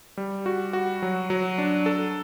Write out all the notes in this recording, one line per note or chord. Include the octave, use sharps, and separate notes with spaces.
G3
F#4
F#4
F#3
F#3
D4
A4